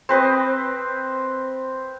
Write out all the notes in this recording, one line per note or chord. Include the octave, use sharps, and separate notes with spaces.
C4 B4 C5 D#5